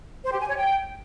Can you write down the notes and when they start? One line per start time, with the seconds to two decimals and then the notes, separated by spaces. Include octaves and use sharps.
0.24 C5
0.32 G4
0.40 G#5
0.48 C#5
0.56 G5